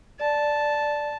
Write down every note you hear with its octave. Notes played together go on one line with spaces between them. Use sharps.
D5 A5